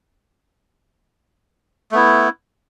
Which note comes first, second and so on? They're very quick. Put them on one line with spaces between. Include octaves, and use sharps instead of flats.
A3 B3 E4